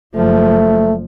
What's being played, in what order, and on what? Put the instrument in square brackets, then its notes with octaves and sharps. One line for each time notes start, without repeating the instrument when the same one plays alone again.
[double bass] F#1 F3 [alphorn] A3